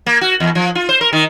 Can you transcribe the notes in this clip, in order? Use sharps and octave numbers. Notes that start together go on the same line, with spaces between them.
A#3
F#4
E2
F3
F4
C5
A#4
D#3